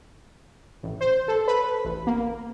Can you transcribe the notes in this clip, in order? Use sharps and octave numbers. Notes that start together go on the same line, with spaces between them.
A1
C5
A4
B4
A1
A#3